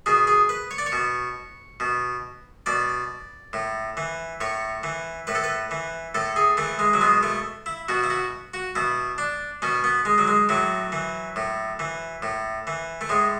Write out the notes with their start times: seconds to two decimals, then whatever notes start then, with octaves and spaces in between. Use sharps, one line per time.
0.06 B2 G#4
0.27 G#4
0.49 B4
0.71 C#5
0.78 D5
0.86 C#5
0.92 B2
1.80 B2
2.66 B2 D5
3.53 A2
3.97 E3
4.41 A2 C#5
4.83 E3
5.27 A2 B4
5.35 A4
5.44 B4
5.71 E3
6.15 A2 A4
6.36 G#4
6.57 E3 A3
6.79 G#3
6.93 F#3
7.01 B2 G#3
7.23 A3
7.66 E4
7.89 B2 F#4
8.04 E4
8.10 F#4
8.54 F#4
8.76 B2 E4
9.18 D4
9.62 B2 C#4
9.84 B3
10.05 G#3
10.18 F#3
10.28 G#3
10.49 A2 F#3
10.92 E3
11.36 A2
11.79 E3
12.22 A2
12.67 E3
13.01 A3
13.09 A2 G#3